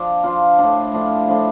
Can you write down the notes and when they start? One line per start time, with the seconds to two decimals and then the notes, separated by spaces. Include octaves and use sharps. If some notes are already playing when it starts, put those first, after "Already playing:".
Already playing: F3 D4
0.24 F3 D4 F4
0.59 A2 F3 D4
0.93 A2 F3 D4
1.28 A2 F3 D4